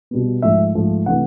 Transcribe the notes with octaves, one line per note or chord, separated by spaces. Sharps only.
B2 G3 B3
G#2 F3 A3 E5
G#2 F3 A3
C3 E3 A3 F#5